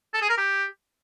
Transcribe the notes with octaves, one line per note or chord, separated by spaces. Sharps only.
A4
G#4
A#4
G4